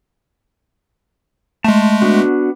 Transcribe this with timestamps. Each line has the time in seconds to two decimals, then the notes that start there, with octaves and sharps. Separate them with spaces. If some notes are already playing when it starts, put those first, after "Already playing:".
1.64 G#3 A3 A5 C6
2.02 B3 D4 F#4